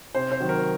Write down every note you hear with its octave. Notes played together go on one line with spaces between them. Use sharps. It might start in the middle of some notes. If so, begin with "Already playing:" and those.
C3 C5
C5
D#3 F#3
A#4